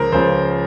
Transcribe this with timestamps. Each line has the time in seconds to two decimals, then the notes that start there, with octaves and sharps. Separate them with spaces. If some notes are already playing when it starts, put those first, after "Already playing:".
Already playing: C#2 C#3 F3 A#4 C5
0.12 C#2 C#3 F3 C5